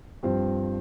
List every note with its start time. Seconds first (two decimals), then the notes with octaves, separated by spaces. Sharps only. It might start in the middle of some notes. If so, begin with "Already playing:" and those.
0.23 G2 F3 C4 G4 C5